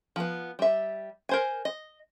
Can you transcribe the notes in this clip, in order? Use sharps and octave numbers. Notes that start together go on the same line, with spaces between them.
F3 B3
G3 E5
A#4 C5 G#5
D#5